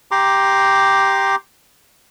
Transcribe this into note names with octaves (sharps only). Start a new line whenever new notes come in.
G4 A#5 C6 D6